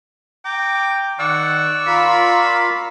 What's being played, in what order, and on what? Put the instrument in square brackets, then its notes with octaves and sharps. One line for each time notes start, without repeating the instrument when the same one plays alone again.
[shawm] G5 [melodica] A#5 D6
[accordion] D#3 [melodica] D5 C#6 E6 [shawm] F#5
[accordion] F4 A#4 F5 [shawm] B5